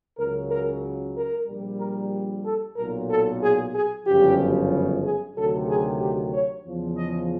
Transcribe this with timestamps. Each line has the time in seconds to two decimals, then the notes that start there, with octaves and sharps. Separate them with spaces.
0.18 C#2 C#3 F#3 A#4
0.50 A#4
1.15 A#4
1.47 A#1 A#2 G3
1.80 A#4
2.44 A4
2.77 B1 A#2 F#3 A#4
3.09 A4
3.42 G#4
3.73 G#4
4.06 G1 F#2 C#3 F3 G4
5.03 G#4
5.35 D2 C3 D#3 F#3 A4
5.68 G#4
6.00 G4
6.33 C#5
6.65 E2 C#3 F3
6.98 D#5